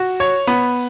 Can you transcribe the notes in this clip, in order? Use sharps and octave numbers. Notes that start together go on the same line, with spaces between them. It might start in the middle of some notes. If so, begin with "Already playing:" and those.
Already playing: F#4
C#5
B3